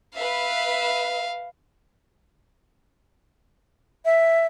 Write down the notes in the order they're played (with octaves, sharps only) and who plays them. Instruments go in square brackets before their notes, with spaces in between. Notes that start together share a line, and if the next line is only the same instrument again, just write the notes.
[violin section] B4 E5 [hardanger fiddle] F5
[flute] E5